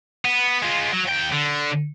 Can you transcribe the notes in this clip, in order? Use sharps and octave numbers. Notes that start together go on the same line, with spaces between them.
B3
G#3 F4
F#3
D#2 G5
D3